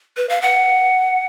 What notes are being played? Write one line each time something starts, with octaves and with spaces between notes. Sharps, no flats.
B4
F5
F#5